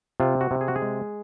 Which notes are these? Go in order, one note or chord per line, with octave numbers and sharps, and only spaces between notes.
C3 F4
F#4
C3
G#4
F#4
G#4
G#3